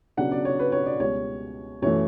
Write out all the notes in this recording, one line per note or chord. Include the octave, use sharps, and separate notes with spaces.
C#3 F#3 B3 D4 F#5
D5
C#5
B4
C#5
D5
C#2 B2 G3 C#5
F#2 E3 A3 C#5